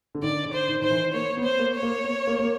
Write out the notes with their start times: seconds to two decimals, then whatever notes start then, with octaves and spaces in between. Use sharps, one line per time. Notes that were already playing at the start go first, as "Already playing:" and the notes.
0.15 D3
0.22 D#3 D5
0.45 D3
0.53 C5
0.68 D#3
0.81 D#3 C5
0.90 E3
1.14 A#3 C#5
1.37 B3
1.44 C5
1.59 A#3
1.74 C#5
1.83 A#3
2.04 B3
2.27 A#3
2.39 A#3